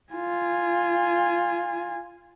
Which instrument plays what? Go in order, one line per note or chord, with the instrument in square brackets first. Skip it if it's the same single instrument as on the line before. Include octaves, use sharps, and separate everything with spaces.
[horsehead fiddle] F4 G#5